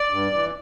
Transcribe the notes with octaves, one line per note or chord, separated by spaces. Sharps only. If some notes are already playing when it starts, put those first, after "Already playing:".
Already playing: D5
G2
E3